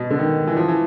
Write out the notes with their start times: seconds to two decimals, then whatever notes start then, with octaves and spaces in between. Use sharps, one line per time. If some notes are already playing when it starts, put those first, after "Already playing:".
Already playing: B2
0.10 D3
0.19 D#3
0.47 E3
0.56 F3
0.68 E3